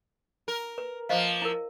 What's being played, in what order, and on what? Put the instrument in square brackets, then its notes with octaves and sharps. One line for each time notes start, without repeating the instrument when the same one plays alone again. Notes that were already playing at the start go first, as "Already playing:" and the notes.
[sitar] A#4
[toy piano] B4
[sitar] F3 A#3 [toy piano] C5 D#5 F5
[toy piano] E4 A#4